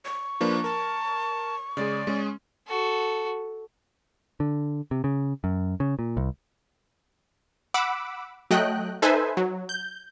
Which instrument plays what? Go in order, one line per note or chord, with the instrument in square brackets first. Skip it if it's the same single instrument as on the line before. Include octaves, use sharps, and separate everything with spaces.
[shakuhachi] C#6
[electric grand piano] F3 A#3 D4 [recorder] B4
[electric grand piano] A#4 [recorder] A5
[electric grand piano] C#3 G#3 G#4 [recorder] D5
[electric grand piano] G#3 C#4 G#4
[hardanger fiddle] F#4 A4
[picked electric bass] D3
C3
C#3
F#2
C#3
A#2
C2
[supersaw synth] F#5 B5 D6 E6
F#3 A3 D#5 G5 F#6
D#4 A4 B4 C5 E5 G#5
F#3
G6